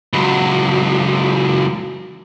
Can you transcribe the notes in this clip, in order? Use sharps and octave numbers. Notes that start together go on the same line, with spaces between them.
C#2 F#3